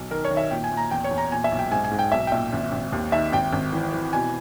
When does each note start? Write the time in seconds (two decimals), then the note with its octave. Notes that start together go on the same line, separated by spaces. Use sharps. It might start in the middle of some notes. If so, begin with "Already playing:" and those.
Already playing: B1
0.11 D#3 A#4
0.25 C#5
0.31 D#3
0.37 E5
0.51 A#2 G5
0.64 G#5
0.71 A#2
0.77 A#5
0.91 E2 G5
1.04 C#5
1.11 E2
1.18 A#5
1.31 A#2 G#5
1.44 E5
1.52 B1
1.59 G5
1.71 G#2 G#5
1.84 G#5
1.91 G#2
1.99 G5
2.12 B1 E5
2.27 G5
2.32 A#2 E5
2.53 G#1
2.72 G#1
2.92 D#2
3.12 D#3 E5
3.33 G#1 G5
3.53 G#1
3.73 E3
3.93 E3
4.13 B2 G#5